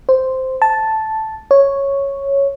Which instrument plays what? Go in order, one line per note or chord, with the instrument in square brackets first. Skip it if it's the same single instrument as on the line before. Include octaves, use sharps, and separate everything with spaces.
[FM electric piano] C5
A5
C#5